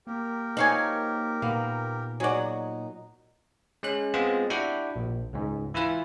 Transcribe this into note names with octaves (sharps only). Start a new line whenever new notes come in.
A#3 G4 A#4
F3 D#4 C#5 F5 G#5
A#2 A#3 B3
F#3 D#4 F#4 G#4 D5
G#3 C#4 F#6
G#3 B3 C4 F4
D4 E4 F#4 G4 G5
A#1
C#2 G#2
E3 E4 F4 B4